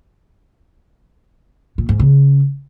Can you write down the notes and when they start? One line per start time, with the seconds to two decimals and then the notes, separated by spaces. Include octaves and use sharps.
1.78 A#2
1.89 G#2
1.99 C#3